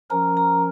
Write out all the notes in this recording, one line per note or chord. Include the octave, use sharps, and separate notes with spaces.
F3 C#4 A#4 A#5
A#5